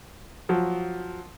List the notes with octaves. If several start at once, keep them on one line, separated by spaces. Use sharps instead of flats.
F3 F#3